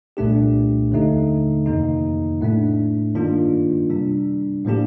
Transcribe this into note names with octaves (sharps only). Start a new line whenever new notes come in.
C2 A#2 A3 D4 G4
D#2 D3 A3 D#4
F2 C3 D#3 A#3 D#4
A2 A3 D4
G2 D#3 A#3 D4 F4
C3 G3 D4
A2 F3 A#3 D4 G4